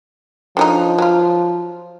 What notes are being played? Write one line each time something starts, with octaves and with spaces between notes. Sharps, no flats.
D3 F3 F#3 D#4
F#3 F4